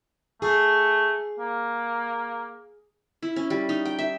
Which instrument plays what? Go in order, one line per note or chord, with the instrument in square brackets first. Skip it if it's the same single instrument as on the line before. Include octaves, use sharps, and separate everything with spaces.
[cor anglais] A3 [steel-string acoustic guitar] G#4
[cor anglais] A#3
[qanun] E4
C#4
G3
D#4
G5
E5